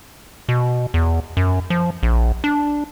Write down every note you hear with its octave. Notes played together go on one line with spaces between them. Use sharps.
B2
E2
F#2
F3
A#1
D4